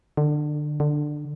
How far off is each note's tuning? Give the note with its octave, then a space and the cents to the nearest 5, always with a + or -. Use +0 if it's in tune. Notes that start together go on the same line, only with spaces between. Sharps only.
D3 +25
D3 +15